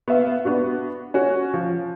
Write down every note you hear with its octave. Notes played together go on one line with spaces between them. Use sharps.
B3 E5 F5
B3 D4 F#4
C#4 F#4
F3